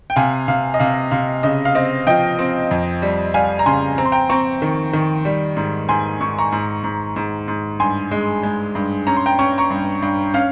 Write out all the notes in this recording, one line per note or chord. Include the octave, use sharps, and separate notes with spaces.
G5
C3 F5 G#5
C3 F5
D#5
C3 F5
C3 F5
C#3 D#5
F5
C4 D#5
F3 D#5 G5
C4
F2
G3
G3 F5 G#5
A#5
C#3 G#5 C6
C4 A#5
C6
G5 A#5
C4 A#5 C#6
D#3
D#3
G3
G#2
G#2 G#5 C6
G#2 C#6
A#5 C#6
G#2
G#2
G#2
G#2
G2 G#5 C6
G#3
G#3
G2
C#4 A#5
C6
G5 A#5
C#4 C#6
A#5 C#6
G2
G2
C#4 F5